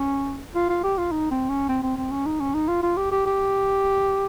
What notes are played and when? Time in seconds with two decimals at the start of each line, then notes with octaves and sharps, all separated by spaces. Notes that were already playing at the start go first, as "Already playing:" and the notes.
Already playing: C#4
0.55 F4
0.69 F4
0.84 G4
0.98 F4
1.12 D#4
1.31 C4
1.50 C#4
1.69 C4
1.83 C4
1.98 C4
2.12 C#4
2.26 D#4
2.40 C#4
2.54 D#4
2.68 F4
2.83 F4
2.97 G4
3.12 G4
3.26 G4